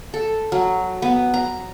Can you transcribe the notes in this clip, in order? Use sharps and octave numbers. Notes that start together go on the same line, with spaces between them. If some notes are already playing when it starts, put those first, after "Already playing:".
A4
F#3
B3
A#5